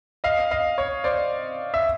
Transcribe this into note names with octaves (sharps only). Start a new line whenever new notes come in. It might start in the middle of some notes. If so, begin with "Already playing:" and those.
D#5 F5
D#5 F5
C#5
C5 D5
E5